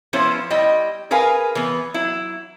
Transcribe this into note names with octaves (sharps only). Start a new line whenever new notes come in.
F3 B3 C#4 E4 C5
G3 E4 D#5 G5
G#4 A#4 B4 F5 G#5
E3 B3
F#3 E4